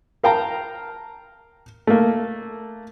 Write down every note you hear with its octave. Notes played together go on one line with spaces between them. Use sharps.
A#4 F5 G5 A5 A#5
A3 A#3